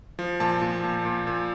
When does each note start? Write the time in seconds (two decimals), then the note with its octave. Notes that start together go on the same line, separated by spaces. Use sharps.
0.19 F3
0.40 A#2 A5
0.62 A#2
0.83 A#2
1.05 A#2
1.27 A#2